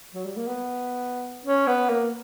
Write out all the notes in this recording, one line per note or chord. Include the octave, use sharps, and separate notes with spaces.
F#3
G3
A#3
B3
C#4
B3
A#3